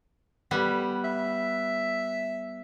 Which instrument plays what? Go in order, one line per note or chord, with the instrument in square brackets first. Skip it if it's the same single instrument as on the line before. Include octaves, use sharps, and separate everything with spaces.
[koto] G3 B3
[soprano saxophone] E5